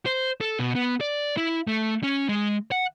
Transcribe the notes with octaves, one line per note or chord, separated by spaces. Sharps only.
C5
A4
B2
B3
D5
E4
A3
C#4
G#3
F#5